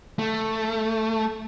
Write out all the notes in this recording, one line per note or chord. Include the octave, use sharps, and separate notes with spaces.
A3